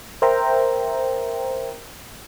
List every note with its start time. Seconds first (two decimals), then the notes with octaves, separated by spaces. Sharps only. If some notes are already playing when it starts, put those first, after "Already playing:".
0.22 A#4 C5 E5 G5 A#5